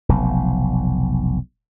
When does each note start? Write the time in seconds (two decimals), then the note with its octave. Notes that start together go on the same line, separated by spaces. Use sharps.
0.09 F1 B1